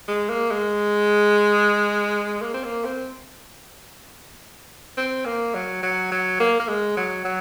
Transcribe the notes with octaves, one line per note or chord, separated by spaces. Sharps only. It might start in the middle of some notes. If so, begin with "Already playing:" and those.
G#3
A#3
G#3
A#3
C4
A#3
C4
C4
A#3
F#3
F#3
F#3
A#3
A#3
G#3
F#3
F#3